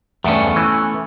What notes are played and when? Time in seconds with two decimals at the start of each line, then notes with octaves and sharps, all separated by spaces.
0.24 E2 G2 A3 B3 C#4
0.56 E3